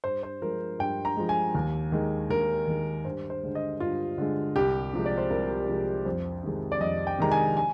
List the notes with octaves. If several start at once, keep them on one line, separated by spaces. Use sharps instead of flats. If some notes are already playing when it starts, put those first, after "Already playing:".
G2 C5
C5
F3 G#3 A#4
G2 G5
A#5
F3 G#3
G#5
D#2
D#3 G#3
D#2 A#4
D#3 G#3
G2 C5
C5
D3 G#3
D#5
G2 F4
D3 G#3
C2 G4
C3 F3 G#3
D5
C5
C2 A#4
C3 F3 G#3
F2 C5
C3 D#3 G#3
D5
F2 D#5
G5
C3 D#3 G#3 A#5
G#5
G#5